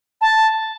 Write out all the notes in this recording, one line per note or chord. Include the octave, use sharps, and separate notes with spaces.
A5